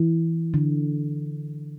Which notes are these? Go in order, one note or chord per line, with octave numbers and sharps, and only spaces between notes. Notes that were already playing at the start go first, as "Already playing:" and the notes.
Already playing: E3
D3